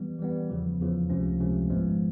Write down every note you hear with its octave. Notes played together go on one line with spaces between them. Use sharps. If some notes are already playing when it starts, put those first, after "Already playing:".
Already playing: E3 G3 B3
E3 G3 B3
E2 C#3 F3
E2 C#3 F3
C#2 C3 F3 A3 C#4
C#2 C3 F3 A3 C#4
G#1 G#2 F3 G#3 B3